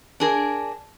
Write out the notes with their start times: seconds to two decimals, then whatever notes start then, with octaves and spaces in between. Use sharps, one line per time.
0.20 D4 G#4 A#4